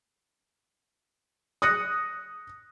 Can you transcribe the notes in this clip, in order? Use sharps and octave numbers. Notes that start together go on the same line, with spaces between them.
D#6 F#6 A#6 C#7